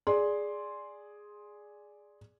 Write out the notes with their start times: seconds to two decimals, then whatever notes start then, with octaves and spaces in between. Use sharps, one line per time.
0.07 G#4 D5 C6